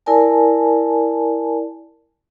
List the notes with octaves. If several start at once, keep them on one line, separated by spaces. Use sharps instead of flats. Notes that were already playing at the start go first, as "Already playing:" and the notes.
E4 A#4 D5 G#5 A5